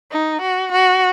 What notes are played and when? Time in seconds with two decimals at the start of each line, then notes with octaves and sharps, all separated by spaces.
0.12 D#4
0.41 F#4
0.72 F#4